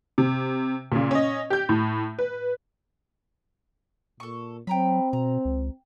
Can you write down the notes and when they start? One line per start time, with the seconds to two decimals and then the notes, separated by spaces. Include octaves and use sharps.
0.18 C3
0.92 A#2 C#3
1.11 C#4 D#5
1.50 G4 G6
1.69 A2
2.19 B4
4.20 A#2 A4 C#6
4.67 F#3 C4 G5 A#5 B5
5.13 B2 A#5
5.45 C#2